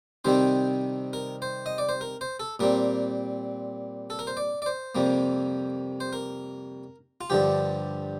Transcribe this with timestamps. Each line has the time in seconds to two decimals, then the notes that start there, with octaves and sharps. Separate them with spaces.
0.25 C3 D#3 G3 C4 C5
1.13 A#4
1.42 C5
1.66 D#5
1.78 D5
1.89 C5
2.01 A#4
2.21 C5
2.40 A4
2.59 A#2 G3 C4 A#4
4.10 A4
4.19 A#4
4.27 C5
4.37 D5
4.62 D5
4.66 C5
4.95 F2 C3 G3 A#3
6.00 C5
6.13 A#4
7.21 F4
7.30 G2 D3 F3 G4